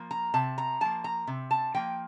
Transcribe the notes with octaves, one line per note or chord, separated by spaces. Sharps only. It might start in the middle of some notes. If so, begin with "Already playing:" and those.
Already playing: F3 A#3
A#5
C3 A5
A#5
F3 A#3 A5
A#5
C3
A5
F3 A#3 G5